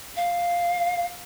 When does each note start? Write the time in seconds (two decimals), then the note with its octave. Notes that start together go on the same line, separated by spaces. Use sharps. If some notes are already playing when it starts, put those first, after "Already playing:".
0.16 F5